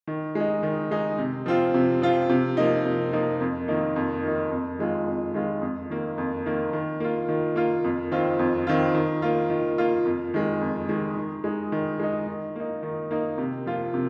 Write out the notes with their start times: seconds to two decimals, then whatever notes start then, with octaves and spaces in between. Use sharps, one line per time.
0.07 D#3
0.35 G#3
0.40 D#4
0.63 D#3
0.91 G#3 D#4
1.18 C3
1.46 F3 C4 F4
1.74 C3
2.02 F3 C4 F4
2.29 C3
2.57 F3 A#3 D#4
2.85 C3
3.13 F3 A#3 D#4
3.41 F2
3.68 D#3 A#3 D#4
3.96 F2
4.23 D#3 A#3 D#4
4.51 F2
4.79 D#3 G#3 F4
5.07 F2
5.34 D#3 G#3 F4
5.62 F2
5.90 D#3 A#3
6.18 F2
6.46 D#3 A#3
6.73 D#3
7.00 A#3 F4
7.29 D#3
7.56 A#3 F4
7.84 F2
8.11 D#3 C4 F4
8.39 F2
8.67 D#3 C4 F4
8.95 D#3
9.22 A#3 F4
9.50 D#3
9.78 A#3 F4
10.05 F2
10.34 D#3 G#3
10.61 F2
10.89 D#3 G#3
11.17 D#3
11.44 G#3 D#4
11.72 D#3
11.99 G#3 D#4
12.27 D#3
12.56 A#3 D#4
12.83 D#3
13.11 A#3 D#4
13.38 C3
13.66 F3 A#3 F4
13.94 C3